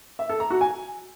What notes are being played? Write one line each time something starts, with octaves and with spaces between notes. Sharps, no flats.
E5
A4
A#5
F#4
G#5